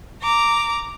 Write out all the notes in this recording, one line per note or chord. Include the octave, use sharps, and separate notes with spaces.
A#5 D6